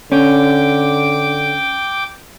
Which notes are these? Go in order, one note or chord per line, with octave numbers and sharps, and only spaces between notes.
D3 C#4 G5 D6